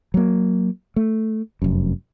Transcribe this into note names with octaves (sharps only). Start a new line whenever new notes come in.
F#3 A#3
A3
F1 F#2